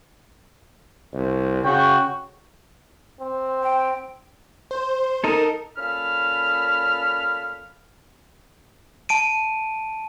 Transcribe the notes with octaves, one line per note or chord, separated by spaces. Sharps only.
C2
C#3 F#4 G5
C4
G5
C5
D#4 A4 A#4
A#2 C#4 A4 F5 B5 F6
A5 D7 D#7